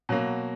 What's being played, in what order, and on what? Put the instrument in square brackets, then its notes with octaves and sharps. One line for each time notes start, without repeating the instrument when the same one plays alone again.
[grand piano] B2 F#3 A#3